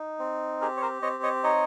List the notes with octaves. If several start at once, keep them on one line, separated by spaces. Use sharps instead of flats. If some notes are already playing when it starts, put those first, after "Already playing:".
Already playing: D#4
C4
G4 G#4 A#4
C#5
A#4 C5
C4 C#5 D#5
C#5 D#5
D#4 C#5 D#5